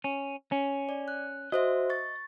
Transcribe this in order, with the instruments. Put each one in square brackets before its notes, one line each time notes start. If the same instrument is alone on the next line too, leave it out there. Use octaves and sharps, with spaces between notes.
[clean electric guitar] C#4
C#4
[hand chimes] D5
F#6
[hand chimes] F#4 C5 E5 [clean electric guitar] D#5
[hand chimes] C#6 A6